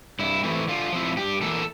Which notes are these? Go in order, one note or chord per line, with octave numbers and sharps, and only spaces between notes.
G2 E4
E3 A3 C4 E4
D3 F4
F3 C4 E4
G2 G4
E3 A#3 A4